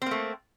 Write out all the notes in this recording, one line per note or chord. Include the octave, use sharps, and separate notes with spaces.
A3 A#3 C4